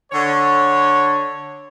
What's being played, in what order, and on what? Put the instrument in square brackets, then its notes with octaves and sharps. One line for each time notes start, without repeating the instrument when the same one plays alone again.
[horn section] D3 C#5